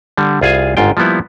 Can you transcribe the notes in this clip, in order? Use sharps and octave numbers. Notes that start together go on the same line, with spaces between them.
D3 G3
C2 F4 G#4 F5 G#5
G1 G#2 F4 G5
F3 G3 A#3 B3 E4